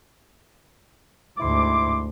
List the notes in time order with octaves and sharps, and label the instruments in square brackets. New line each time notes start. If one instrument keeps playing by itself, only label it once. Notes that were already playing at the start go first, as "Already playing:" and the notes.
[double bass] D2 G#2 [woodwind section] E4 C6 D6